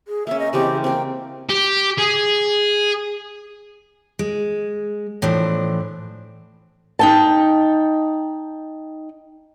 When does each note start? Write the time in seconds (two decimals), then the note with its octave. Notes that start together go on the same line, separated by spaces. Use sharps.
0.08 G#4
0.27 A#3 C#4 E5
0.39 D#5
0.53 C#3 E3 C4 G4
0.84 A#3 C4 G5
1.49 G4
1.98 G#4
4.19 G#3
5.22 A2 E3 F3 D4
6.99 D#4 G5 A5